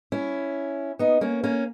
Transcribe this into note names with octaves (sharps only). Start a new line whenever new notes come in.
C#4 E4
B3 D#4
A#3 C#4
A#3 C#4